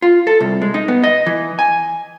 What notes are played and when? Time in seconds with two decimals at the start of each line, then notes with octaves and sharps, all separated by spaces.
0.02 F4
0.27 A4
0.40 C2
0.61 G#3
0.74 D#4
0.88 B3
1.04 D#5
1.26 E3
1.59 G#5